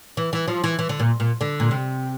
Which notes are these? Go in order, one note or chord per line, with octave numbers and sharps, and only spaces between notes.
E3
E3
F3
E3
E3
D3
A#2
A#2
D3
A#2
C3